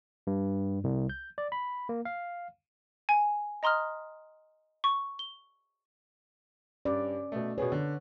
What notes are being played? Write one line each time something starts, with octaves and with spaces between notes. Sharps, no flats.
G2
C2
G6
D5
B5
A#3
F5
G#5
D#5 A#5 C6 D#6 F6
C#6
G7
G2 C#4 D5
B2 A3
B2 B3 G#4 B4 C#5
D3